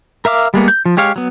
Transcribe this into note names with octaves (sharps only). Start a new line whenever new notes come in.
A#4 E5 F5 D6
G3 G#3 A#3 B3
G6
F3
G#3 G4 C#5 F5
F#3 B3